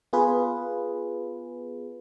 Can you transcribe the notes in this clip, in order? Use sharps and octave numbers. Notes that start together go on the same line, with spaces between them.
B3 F4 G#4 B4